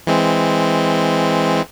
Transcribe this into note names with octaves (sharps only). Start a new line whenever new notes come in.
E3 G#3 C4